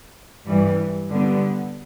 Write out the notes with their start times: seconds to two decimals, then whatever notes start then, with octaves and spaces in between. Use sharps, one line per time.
0.45 G2 E3 G3
1.11 D3 G3 B3